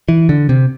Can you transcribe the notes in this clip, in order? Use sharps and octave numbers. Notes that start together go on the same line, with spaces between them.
E3
D3
C3